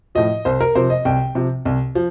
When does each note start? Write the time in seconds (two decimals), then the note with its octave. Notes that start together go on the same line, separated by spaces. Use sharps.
0.15 A2 F3 D#5
0.45 C2 C5
0.61 A#4
0.75 C3 F3 C5
0.90 D#5
1.05 C2 G5
1.35 C3 F3
1.65 C2
1.95 F3